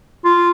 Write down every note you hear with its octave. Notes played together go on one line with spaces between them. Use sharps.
F4